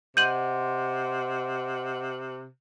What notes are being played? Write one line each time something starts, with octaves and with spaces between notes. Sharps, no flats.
C3 D#5 F#5 C6 G6 D#7 F#7